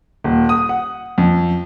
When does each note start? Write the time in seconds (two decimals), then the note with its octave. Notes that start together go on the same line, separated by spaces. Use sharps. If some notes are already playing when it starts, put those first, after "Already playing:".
0.24 D#1
0.49 D#6
0.69 F#5
1.18 F2